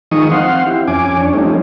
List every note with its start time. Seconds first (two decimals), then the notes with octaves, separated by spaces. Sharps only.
0.11 D#3 F3 G#3 D#4 C#6 D#6
0.31 C4 F5 F#5 C6
0.67 E4 G4
0.87 F2 C#4 G#5 D6
1.21 D4 C#5
1.33 F3 G3 A3 C4 C#4 D#4